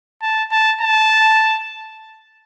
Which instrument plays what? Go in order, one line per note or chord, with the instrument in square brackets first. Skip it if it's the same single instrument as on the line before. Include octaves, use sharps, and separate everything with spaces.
[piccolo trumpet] A5
A5
A5